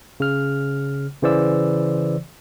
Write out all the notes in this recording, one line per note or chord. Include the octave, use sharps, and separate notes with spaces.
C#3 F6
C#3 E3 C5 D5 E6